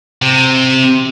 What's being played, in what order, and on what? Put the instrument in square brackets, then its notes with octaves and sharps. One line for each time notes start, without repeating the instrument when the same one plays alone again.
[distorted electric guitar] C3